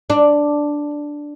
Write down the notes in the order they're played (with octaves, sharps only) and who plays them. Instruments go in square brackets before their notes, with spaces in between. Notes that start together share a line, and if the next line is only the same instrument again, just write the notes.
[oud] D4